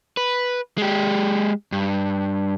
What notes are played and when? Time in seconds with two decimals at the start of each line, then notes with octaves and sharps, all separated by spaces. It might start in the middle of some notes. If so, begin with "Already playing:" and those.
0.17 B4
0.78 G#3 G4
1.72 G2